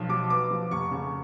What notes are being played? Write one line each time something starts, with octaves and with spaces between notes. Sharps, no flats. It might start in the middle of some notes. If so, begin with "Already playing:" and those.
Already playing: B1 F3
F#3 D6
B3 D6
F3
F1 C#6
C#3